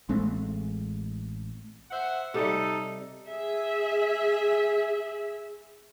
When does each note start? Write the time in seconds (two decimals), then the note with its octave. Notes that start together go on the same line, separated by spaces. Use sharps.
0.09 A1 G#3 A3 C4
1.91 C5 E5 F#5
2.34 C3 G3 D#4 A4
3.29 G#4 E5